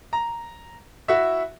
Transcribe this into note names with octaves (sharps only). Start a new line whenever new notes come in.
A#5
E4 F#4 E5